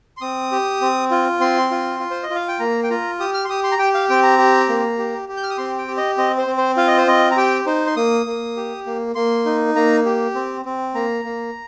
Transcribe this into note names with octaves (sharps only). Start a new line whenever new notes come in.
C6
C4 D#6
G4
C4
F4
C4 C6
F4
F4
C5
D#5
F4
F5
G5
A#3 A#5
G5
F4 A#5
G4 D#6
F6
C6
G4 D#6
C6
A#5
G4 G5
F5
C4 G5
A#5
G4
A#3
G4
G4
G6
F6
D#6
C4 C6
G5
G4
D#5
C4 D#5
C5
C4
C5
F4 F5
D#5
C5
C4 D#5
A#5
G4 G5
D#4 C5
C6
A#3 D#6
A#3
G4
A#3
A#3 C6
D#4
A#3 A#5
G4
C4
C4
A#3 A#5
A#3